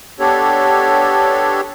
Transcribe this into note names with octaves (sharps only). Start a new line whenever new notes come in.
B3 D4 G4 A4 C#5